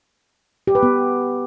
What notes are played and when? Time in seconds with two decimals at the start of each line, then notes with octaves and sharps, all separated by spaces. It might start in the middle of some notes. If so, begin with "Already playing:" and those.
0.67 G4
0.75 B4
0.83 B3